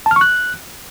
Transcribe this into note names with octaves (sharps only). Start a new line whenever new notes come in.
A5
F6
C#6
F#6